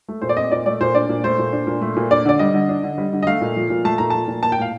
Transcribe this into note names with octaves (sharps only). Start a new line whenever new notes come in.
A3
A#2 C5
D5
C4 D#5
A#2 D5
A3 D5
A#2 C5
D4 D5
A#2
A3 C5
A#2
D4
A#2
A3
A#2
D4 D5
D3 D5
G3 D#5
D3
D4
D3
G3
D3
D#5
A3 F5
A#2
F3
A#2
A3 A5
A#2 A#5
F3 A5
A#2
A#3 A5
G5
A2 F5